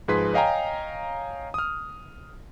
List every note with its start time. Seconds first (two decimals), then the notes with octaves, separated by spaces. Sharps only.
0.08 G#2 F3 G#4 B4 C6 B6
0.33 C#5 D#5 F5 G5 G#5 A#5
1.54 D#6 F6